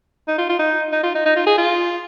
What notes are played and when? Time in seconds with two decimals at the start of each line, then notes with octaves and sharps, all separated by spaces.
0.28 D#4
0.38 F4
0.49 F4
0.59 D#4
0.92 D#4
1.03 F4
1.15 D#4
1.26 D#4
1.36 F4
1.46 G#4
1.58 F4